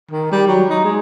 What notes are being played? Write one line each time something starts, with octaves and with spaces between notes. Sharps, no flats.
D#3
G3
F#3
D#4
G#3